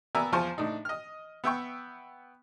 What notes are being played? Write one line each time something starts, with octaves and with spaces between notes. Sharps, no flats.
B3 A#4 D5 E5 G#5 A#5
E2 F3 C5 G#5 A5 C#6
A2 D4 D#4
D#5 F6
B3 E5 G5 C#6